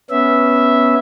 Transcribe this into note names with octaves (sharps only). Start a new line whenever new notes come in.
B3 C#4 E5